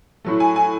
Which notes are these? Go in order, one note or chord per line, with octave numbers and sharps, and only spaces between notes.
A2 F#3 A3
G#5
G#5